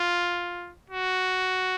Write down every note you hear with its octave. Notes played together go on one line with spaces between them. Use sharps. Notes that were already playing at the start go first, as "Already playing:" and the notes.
Already playing: F4
F#4